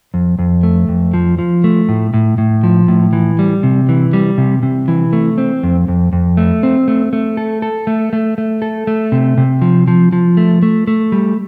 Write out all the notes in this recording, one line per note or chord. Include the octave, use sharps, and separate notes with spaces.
F2
F2
A3
F2
F3
F3
A3
A2
A2
A2
F3
A2
E3
G3
C3
E3
G3
C3
C3
E3
A3
C4
F2
F2
F2
A3
C4
A3
A3
A4
A4
A3
A3
A3
A4
A3
C3
C3
F3
F3
F3
A3
A3
A3
G3